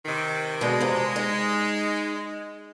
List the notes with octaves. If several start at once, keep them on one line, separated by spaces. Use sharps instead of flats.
C3 D#3
B2 D3 G#3
F2 C3
D#4